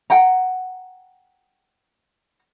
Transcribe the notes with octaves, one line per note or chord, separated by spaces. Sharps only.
F#5 G5 A#5